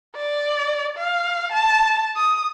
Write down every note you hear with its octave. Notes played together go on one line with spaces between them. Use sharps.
D5
F5
A5
D#6